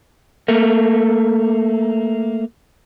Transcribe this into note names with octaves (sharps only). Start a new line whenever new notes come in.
A3 A#3